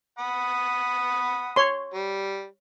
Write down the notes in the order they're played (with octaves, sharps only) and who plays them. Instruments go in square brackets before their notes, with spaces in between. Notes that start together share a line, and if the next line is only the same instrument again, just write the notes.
[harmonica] F#5 B5 D#6
[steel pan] C#5 C6
[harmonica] G3